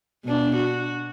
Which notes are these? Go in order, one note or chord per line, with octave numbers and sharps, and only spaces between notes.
B2 D4
F#4